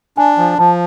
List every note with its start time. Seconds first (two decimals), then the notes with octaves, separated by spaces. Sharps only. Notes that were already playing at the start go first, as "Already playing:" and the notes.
0.17 D4 G#5
0.38 F3 G#5
0.59 F3 A5